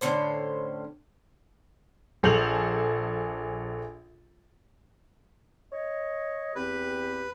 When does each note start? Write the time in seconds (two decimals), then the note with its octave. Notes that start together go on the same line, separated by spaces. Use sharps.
0.01 A2 D3 C#4 C5
2.23 A#1 G#4 A4 G6 F7 F#7
5.72 C#5 D#5
6.55 E2 C4 G4 B4